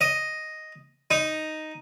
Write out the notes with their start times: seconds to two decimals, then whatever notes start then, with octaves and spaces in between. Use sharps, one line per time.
0.01 D#5
1.11 D#4